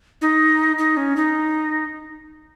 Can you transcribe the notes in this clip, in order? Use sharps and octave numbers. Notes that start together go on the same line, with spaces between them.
D#4
D#4
C#4
D#4